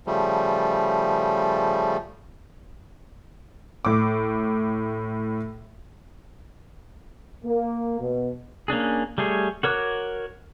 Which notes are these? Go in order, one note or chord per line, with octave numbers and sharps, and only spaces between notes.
C#3 F3 G3 A3
A2 D6
A#3
B2
A#3 C#4 D4 G#4
G3 A3 G#4 C#5
F#4 A#4 C#5 D6 F#6